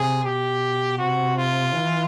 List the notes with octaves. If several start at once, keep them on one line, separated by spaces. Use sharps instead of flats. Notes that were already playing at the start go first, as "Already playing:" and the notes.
Already playing: C3 G#4
B2 G4
C3 F#4
F4
E3